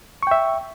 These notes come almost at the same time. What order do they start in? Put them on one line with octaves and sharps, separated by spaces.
C#6 G5 E5